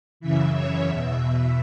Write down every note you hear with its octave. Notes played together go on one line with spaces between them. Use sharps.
F#2 C#3 E3 E5
C#5
E2 B2 E5